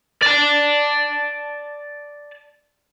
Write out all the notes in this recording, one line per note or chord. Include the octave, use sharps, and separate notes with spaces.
D5 A5